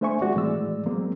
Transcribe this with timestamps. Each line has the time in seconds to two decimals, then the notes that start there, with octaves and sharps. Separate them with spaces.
0.01 A3 D4 C5 E5 G#5 C#6
0.21 G#3 C4 F#4 D5
0.36 A2 E3 G#3 A3 D5 E6
0.86 F#3 G#3 A#3 C4